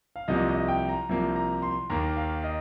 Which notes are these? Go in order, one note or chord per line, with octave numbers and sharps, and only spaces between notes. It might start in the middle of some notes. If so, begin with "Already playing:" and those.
F5
C2 C3 F3 A#3 D#5
D#5
G5
A#5
C2 C3 F3 A#3
A#5
C6
D#2 D#3 A#3 A#5
F5
D#5